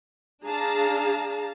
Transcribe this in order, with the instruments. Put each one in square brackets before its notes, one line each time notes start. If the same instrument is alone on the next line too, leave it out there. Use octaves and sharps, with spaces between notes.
[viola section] D4 G#4 F5 A5 A#5